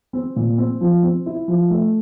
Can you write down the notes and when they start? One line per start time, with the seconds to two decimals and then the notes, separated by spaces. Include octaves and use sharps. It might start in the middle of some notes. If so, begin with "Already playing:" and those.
0.13 C4
0.36 A#2
0.58 C4
0.81 F3
1.03 C4
1.26 E4
1.48 F3
1.70 A3